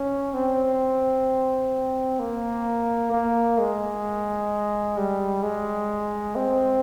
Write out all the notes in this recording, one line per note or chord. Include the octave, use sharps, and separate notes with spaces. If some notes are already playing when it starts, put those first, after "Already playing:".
Already playing: C#4
C4
A#3
A#3
G#3
G3
G#3
C4